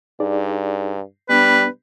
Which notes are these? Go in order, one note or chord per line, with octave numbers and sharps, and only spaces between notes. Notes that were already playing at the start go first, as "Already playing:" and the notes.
G2 D#4 G#4 D5
G3 B3 D4 B4